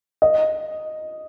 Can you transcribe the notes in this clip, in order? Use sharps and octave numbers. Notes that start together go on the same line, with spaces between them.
D#5